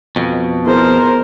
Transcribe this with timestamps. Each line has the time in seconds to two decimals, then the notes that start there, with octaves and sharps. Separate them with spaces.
0.16 F2 B2
0.66 B3 E4 G#4 A#4 C5